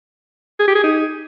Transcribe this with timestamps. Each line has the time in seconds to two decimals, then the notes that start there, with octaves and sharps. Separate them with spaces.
0.59 G#4
0.67 G4
0.75 G#4
0.83 D#4